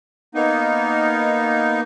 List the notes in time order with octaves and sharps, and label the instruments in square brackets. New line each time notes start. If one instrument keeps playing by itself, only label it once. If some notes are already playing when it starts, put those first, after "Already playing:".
[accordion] A#3 B3 D#4